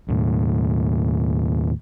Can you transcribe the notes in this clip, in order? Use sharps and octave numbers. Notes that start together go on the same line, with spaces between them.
D#2 A2